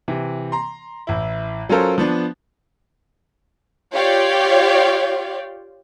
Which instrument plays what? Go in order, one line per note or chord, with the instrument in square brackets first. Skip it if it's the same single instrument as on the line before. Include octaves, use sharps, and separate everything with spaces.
[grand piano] C3 E3
A#5 C6
A1 E4
F#3 C#4 F4 A4 A#4 C5
F3 B3 D4
[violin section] F4 G4 C#5 D5 F5 G5